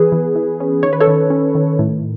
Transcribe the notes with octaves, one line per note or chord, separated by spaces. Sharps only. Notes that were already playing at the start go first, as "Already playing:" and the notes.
Already playing: E3 B3 G#4 B4
E3
E3
C#4
D#3 C#5
B4
A4 C#5
D#3
C#4
D#3
A2